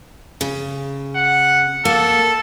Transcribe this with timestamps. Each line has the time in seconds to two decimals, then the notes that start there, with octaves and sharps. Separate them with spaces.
0.41 C#3
1.16 F#5
1.85 A#3 A4